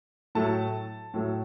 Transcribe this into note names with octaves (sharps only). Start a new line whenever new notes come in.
A2 F#3 A3 A5
A2 F#3 A3